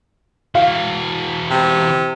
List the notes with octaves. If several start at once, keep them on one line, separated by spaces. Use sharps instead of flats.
E3 F#4 F5
C3